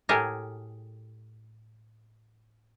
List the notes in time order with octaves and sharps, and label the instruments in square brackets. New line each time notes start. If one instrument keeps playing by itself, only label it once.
[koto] A2 A3 G4 G#4 A#4